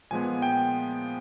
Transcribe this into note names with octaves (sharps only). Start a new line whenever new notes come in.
A#2 F3 G#3 B3 G#5
G5